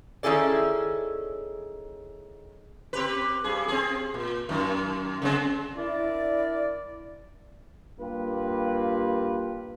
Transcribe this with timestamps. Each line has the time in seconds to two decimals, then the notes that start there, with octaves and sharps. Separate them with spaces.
0.23 D#3 C#4 E4 G#4 A4 D5
2.93 C4 G4 B4
3.44 G2 G#4
3.68 C4 G#4
4.14 A#2
4.49 F#2 D#3
5.22 C#3 G#3 C4
5.77 D4 E4 A#4 D5
8.00 G2 A#3 F4 G4 B4